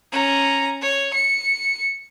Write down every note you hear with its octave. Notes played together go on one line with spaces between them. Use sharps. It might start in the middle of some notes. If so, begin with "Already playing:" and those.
C#4 A#5
C#5
C#7